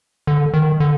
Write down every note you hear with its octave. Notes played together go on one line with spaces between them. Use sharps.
D3
D#3
D3